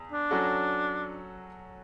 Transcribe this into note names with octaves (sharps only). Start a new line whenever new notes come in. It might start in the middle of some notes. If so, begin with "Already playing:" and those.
Already playing: E2
D4
F#3 C#4 F#4 A4